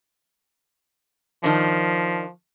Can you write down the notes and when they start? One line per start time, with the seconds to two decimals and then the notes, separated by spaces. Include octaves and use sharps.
1.44 D#3 F3 D4